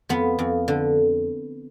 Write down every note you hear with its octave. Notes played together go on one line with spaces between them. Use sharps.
F2 B3
F2
D3